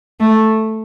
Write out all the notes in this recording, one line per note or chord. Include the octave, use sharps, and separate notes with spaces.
A3